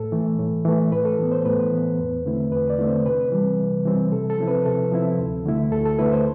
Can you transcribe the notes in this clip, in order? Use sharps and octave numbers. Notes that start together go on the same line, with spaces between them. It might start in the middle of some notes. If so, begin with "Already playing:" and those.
Already playing: A2 A4
E3 A3
A2
E3 A3
A2 B4
A4
E3 B3
C5
A2 B4
E3 B3
E2
D3 A3 C4 E4
E2 B4
D5
D3 A3 C4 E4
C5
C3 B4
E3 G3 C4
C3
E3 G3 C4
C3 A4
A4
F3 C4 E4
B4
C3 A4
F3 C4 E4
D2
D3 A3 E4
D2 A4
A4
D3 A3 E4 B4
C5